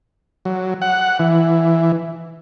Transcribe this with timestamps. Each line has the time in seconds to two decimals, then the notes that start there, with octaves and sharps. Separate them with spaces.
0.45 F#3
0.82 F#5
1.19 E3